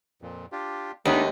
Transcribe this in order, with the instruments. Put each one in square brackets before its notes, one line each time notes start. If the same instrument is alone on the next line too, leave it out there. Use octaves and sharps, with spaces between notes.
[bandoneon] F2 A#2
D4 F4 G4
[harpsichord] D#2 [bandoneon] G#3 A3 D#5 [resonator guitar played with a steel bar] B3 D4 D#4